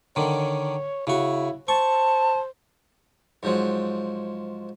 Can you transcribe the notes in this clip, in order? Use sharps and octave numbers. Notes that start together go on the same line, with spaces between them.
D3 D#3 C#5
C#3 E4 F#4
C5 A5 C#6
G#2 F3 F#3